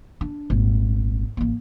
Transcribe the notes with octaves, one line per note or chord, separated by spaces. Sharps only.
D4
D#1 G#1
A1 A#3